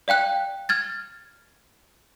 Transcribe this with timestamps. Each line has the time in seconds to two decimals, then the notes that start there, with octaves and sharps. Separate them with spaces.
0.08 D5 F5 G5 F#6
0.69 F6 G#6 A6